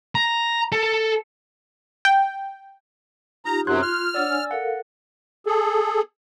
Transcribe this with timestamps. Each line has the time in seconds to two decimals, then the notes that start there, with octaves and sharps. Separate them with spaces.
0.15 A#5
0.72 A4
2.05 G5
3.45 D#4 F4 G4 A#5
3.67 F#2 C3 F#3 C6 F#6 G#6
3.82 F4 F6
4.14 D4 C#5 D5 F#5 E6 A6
4.30 G#5
4.51 A4 A#4 F5 F#5
5.46 G#4 A4